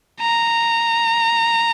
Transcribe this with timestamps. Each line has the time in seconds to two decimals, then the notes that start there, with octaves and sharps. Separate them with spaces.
0.21 A#5